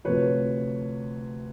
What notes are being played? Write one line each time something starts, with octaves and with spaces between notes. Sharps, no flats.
D2 C3 F3 B4 C#5